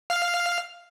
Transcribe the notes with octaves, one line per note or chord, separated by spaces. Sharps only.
F5 F6